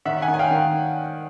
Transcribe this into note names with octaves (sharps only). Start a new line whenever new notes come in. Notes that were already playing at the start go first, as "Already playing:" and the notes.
D#3 E5 F#5
F#5 G#5
D#3
G#5
F5 G5
D#3